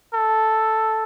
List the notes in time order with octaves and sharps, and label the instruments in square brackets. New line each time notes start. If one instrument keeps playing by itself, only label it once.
[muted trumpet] A4